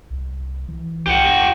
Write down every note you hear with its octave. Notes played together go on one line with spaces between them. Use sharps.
C2
E3
C2 G4 F#5
E2